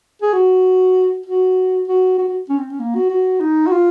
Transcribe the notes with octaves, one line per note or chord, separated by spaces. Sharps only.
G#4
F#4
F#4
F#4
F#4
F#4
C#4
C4
C#4
A#3
F#4
F#4
D#4
F#4
F4